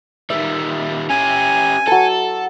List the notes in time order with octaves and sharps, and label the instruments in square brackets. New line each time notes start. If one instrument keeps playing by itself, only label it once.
[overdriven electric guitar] D#3 G3 [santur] E5
[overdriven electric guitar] C#4 G4 [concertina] G#5
[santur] F#3 A5 [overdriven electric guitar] A4